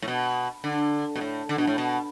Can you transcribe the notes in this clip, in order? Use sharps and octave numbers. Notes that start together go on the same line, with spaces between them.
A2
B2
D3
B2
A2
D3
B2
A2
B2